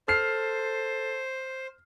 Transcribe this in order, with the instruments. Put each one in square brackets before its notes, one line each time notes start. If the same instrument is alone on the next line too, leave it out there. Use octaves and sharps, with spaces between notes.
[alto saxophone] A4 [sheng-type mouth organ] C5 [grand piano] F6 C7